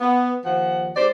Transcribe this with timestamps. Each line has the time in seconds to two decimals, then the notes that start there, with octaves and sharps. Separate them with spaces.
0.01 B3
0.44 D#2 F3 F#5
0.96 G#2 G4 C5 D5